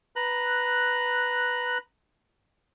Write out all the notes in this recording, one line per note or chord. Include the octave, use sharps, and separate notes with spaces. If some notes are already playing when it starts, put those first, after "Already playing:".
B4 A#5 F#6